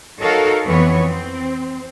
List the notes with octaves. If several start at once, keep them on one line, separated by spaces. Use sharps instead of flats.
D#4 F#4 A4 A#4 C#5 F5
F2 E3 B3 C#5
C4